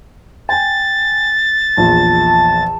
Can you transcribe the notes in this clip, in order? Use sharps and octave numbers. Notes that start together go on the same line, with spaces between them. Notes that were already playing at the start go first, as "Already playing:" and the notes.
G5 G#5 A6
A#1 E2 F4 A5